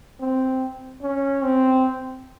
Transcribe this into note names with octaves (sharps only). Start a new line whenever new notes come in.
C4
C#4
C4